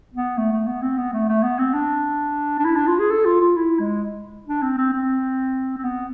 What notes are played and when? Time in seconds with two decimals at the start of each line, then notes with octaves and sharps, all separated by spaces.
0.14 B3
0.38 A3
0.52 A3
0.67 B3
0.82 C4
0.98 B3
1.13 A3
1.29 A3
1.43 B3
1.59 C4
1.74 D4
2.60 D4
2.65 E4
2.76 D4
2.87 F4
3.00 G#4
3.11 A4
3.26 F4
3.41 F4
3.56 E4
3.80 G#3
4.47 D4
4.63 C4
4.78 C4
4.93 C4
5.78 C4
5.84 B3